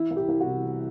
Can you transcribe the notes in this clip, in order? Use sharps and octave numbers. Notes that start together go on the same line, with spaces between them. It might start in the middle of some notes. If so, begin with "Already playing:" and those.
Already playing: E3 E4
C2
G4
C2
F#4
C3
E3